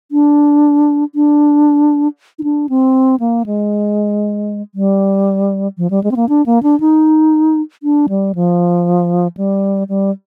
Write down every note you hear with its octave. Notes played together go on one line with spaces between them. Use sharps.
D4
D4
D#4
D4
C4
A#3
G#3
G3
F3
G3
G#3
C4
A#3
D4
A#3
D4
D#4
D4
G3
F3
G3
G3